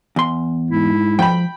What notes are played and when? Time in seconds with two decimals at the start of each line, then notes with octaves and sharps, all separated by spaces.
0.16 E2 C6
0.71 G#2 E4
1.19 F3 G5 B5